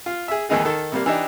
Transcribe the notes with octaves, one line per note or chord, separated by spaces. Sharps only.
F4
G#4 E5
D#2 D#3 E3 G#3 D#4 G#4
D#3 A4
C3 G3 A#3
E3 D4 D#4 G4